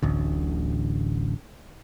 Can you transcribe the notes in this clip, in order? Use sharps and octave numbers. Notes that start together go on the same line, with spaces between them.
D1 A1 D2